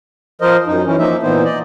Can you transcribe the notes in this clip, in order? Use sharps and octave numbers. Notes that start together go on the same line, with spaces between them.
F3 A#4 C5 D#5
F#2 D#4
E3 C#4
F3 A#3 D#4 E5
A#2 E3 B3 D#4 C5
D5 D#5